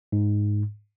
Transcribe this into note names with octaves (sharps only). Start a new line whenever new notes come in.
G#2